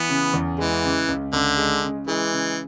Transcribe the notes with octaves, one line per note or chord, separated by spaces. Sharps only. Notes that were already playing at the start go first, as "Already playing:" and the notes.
Already playing: E3 B3
C#3
E2
E3 G#3
C#3
C#2
C#2 D3
G#3
C#3
E3 G#3
C#3